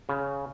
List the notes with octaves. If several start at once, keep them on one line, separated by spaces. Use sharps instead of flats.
C#3